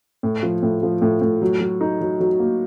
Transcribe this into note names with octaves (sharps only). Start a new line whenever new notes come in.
A2
F3
A2
F3
A2
A2
F#3
F#3
D#4
F#3
F#3
A#3